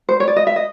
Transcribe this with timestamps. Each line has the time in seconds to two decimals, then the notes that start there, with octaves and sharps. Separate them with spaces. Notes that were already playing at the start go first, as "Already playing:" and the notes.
0.09 C5
0.20 C#5
0.28 D5
0.36 D#5
0.47 E5
0.56 D#5